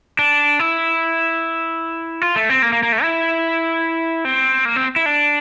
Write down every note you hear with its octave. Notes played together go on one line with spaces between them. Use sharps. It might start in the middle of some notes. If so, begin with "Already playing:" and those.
D4
E4
F4
A3
C4
A#3
A#3
A#3
A3
E4
C4
A#3
C4
E4
D4